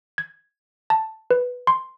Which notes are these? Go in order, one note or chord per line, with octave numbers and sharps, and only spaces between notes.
G#6
A5
B4
C6